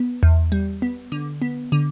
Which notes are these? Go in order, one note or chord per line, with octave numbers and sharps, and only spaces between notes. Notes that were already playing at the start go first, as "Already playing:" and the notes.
Already playing: B3
E2
G3
B3
D3
B3
D3